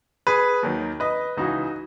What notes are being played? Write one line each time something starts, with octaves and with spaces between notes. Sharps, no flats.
G#4 B4
D#2 D#3 F#3
B4 D#5
C#2 C#3 E3 D#4 F#4